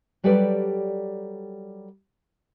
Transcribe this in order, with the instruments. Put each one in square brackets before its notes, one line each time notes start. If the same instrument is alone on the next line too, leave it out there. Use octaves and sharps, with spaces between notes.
[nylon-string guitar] F#3 G3 G4 A4 B4 D5